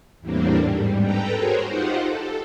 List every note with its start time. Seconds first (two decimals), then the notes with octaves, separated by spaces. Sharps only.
0.21 E2 A2 G3 A#3 C4 D4
0.60 G#2 G3
1.02 A4 B4 G5 A#5
1.35 F#4 G#4 A#4 C5 C#5
1.67 D#4 F4 G4 C5 F#5
1.99 A4